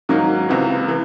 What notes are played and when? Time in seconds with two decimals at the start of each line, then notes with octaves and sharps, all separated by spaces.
0.09 G#2 D#3 F#3 A#3
0.48 C#2 C3 E3
0.88 E3